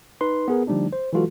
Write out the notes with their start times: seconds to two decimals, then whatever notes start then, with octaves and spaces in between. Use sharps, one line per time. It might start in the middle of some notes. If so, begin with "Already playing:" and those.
0.21 D#4 B4 C6
0.48 B3 G#4 A#4
0.67 D3 F3 G3 A3 D4 D#4
0.93 C5
1.13 E3 F#3 G#3 F4 F#4 A4